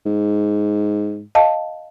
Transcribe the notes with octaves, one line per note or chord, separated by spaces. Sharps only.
G#2
D#5 F5 A5